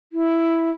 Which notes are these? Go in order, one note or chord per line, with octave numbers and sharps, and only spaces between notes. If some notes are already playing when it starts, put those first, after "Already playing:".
E4